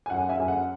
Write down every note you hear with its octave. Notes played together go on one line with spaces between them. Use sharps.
G#5
F#2 F#5
E5 G#5
F#2 G#5
F#5